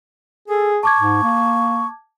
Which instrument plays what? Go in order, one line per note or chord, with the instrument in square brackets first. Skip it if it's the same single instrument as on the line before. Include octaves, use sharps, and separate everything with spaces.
[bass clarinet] G#4 [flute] A4
[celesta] A5 D6 G#6 [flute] C#6
[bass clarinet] G#2
A#3